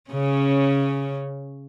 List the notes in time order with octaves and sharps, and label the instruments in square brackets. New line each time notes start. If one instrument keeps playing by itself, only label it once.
[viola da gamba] C#3 C#4